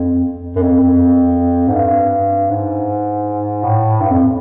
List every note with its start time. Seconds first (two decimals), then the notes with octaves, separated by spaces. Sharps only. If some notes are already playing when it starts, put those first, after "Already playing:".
Already playing: F2
0.56 F#2
0.62 F2
0.80 F2
1.68 G#2
1.75 G2
2.50 G#2
3.64 A2
4.01 G2
4.11 F2